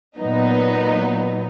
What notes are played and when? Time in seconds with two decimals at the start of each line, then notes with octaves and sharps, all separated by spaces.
0.18 A#2 F#3 B3 D#4